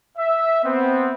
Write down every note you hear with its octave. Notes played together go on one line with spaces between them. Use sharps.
E5
B3 C4